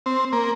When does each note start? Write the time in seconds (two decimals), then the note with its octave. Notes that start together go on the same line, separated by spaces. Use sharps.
0.06 C4
0.33 A#3